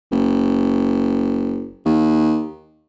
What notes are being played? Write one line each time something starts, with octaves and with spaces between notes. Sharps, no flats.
F#1
D#2